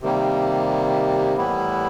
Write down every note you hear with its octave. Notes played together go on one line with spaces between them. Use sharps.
C3 D#3 G3 A#3
A2 E3 G3 B3 E4